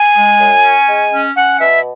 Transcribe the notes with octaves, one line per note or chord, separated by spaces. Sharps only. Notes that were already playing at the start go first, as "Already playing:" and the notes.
Already playing: G#5
G#3
F#2
C#4
G#3
C#4
C#4 F#5
B2 E5